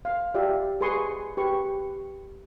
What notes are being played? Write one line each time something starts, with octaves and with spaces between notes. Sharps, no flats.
F5
F4 G4 D5 E5
G#4 B4 G#5 C6 C#6 D#6
G4 B4 C#6